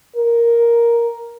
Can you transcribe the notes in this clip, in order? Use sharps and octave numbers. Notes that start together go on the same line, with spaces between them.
A#4